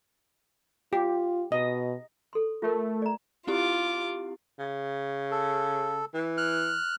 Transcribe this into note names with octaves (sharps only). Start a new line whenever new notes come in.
F4 G4
B2 D#5
A4 C6
A3 F4 A#4
D5 A#5
C4 E4 F4 G4 D6
C#3
A4
E3
F6 F#6